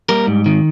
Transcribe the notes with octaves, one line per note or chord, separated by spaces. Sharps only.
G3 A#3 A#4
G#2
D#3